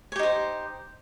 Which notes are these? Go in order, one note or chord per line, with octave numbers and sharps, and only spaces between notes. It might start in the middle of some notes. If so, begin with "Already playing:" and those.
D#4 G4 C5 C#5